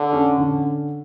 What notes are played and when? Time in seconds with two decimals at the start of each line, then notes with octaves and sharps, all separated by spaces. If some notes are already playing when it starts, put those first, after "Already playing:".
Already playing: D3
0.13 C#4
0.38 D3